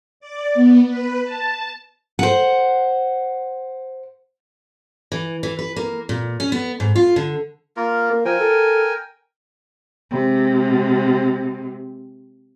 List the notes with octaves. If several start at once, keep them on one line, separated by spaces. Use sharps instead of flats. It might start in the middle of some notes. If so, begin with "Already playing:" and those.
D5
B3
B4
A5
C5 F#5
E3
E3
B4
A#3
A#2
C#4
B3
G#2
F4
D3
A#3 F4 A#4
A#3
F3 A#4 G5 G#5
A4
C3 G#3